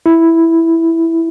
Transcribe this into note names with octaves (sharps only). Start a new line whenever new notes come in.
E4